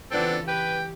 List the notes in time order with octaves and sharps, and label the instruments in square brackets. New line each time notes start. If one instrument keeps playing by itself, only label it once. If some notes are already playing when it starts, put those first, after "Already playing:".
[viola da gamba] C#3 E3 F4 [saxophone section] B3 C4 D4 [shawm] A4
[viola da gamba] G4 [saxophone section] B4 [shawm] G5